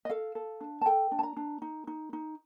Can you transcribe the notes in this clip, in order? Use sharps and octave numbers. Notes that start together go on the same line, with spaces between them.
D#5
A4 F5
A4
D4
A5
A4 G5
D4
A5
A#5
D4
D#4
D#4
D#4